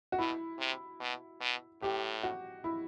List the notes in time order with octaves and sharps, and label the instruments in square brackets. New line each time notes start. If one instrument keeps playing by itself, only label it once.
[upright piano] F#4
[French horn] B2 [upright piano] E4
[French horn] C3
B2
B2
[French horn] A2 [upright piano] G4
[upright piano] F#4
E4